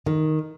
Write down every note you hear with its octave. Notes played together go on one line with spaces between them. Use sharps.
D#3